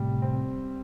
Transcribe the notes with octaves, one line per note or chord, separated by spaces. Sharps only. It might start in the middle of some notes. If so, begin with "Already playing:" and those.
Already playing: A2 C3 G3
C4